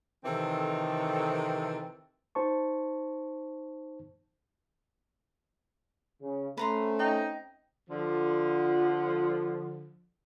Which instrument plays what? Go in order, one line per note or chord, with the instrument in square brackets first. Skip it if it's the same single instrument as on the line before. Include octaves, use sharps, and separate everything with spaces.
[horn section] C3 D#3 E3 C4 A4
[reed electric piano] D#4 C5 A5 C#6
[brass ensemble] C#3
[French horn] A3 [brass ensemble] C4 C#4 [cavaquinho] B4 A#5 C6
[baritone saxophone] D#4 [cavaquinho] G5
[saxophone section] D3 F3